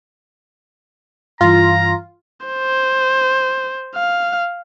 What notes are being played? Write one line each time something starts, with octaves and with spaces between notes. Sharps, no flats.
G2 E3 F4 A#5
C5
F5